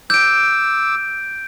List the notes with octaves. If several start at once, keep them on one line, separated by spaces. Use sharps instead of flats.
D6 E6 G6 D7